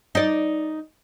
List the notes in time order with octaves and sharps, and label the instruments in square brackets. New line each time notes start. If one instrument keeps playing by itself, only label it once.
[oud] D#4 D5